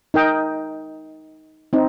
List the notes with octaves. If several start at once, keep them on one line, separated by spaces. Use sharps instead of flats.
D#4 A#4 D#5 G5
C4 D#4